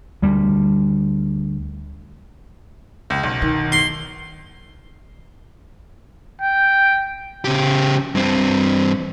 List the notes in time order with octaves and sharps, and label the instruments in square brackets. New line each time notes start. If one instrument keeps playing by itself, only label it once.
[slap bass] D2 G3
[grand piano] C#2
B1
[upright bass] D#3
[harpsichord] C6
[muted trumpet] G5
[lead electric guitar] C#3 G4
G2 C4